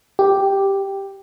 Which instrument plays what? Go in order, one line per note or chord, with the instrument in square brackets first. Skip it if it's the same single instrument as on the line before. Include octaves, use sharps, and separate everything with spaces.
[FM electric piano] G4